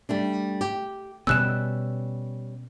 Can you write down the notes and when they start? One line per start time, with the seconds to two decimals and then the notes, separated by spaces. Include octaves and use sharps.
0.09 G3 A3 D4
0.61 G4
1.27 B2 G3 B3 C#4 E6 F#6 E7